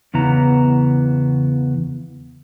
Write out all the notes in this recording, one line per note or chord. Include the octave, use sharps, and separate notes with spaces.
E2 C#3 B3 E4 A#5